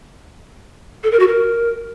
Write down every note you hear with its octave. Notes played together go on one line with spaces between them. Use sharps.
A4
A#4
F#4
A#4